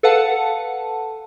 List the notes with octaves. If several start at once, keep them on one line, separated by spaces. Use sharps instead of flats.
A4 B4 F5 F#5 A5